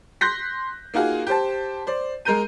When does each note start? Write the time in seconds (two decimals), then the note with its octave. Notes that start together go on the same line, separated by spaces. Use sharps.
0.21 C6 F#6 G6 A#6 B6
0.94 A#3 D#4 F4 F#4 G#4
1.27 G4 C5 A5
1.87 C5 D5
2.25 G#3 A#4 A#5 G6 D#7